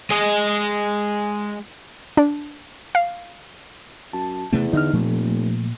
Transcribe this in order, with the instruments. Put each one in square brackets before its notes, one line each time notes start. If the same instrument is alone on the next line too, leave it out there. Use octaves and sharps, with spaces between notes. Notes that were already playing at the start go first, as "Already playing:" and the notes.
[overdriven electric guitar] G#3 D#5
[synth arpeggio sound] D4
F5
[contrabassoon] F#2 [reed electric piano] A5
[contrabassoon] E2 [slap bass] C3 A3 C4
[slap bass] D3 [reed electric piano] D#4 D#5 F6
[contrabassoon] F1 [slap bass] A#2 [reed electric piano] F3 A3